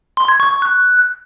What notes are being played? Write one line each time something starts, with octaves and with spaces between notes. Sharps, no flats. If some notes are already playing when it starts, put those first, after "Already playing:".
C6
G#6
C#6
C#6
F#6